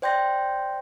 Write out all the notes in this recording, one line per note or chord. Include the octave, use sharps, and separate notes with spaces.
C5 D5 G5 C6 G6 A#6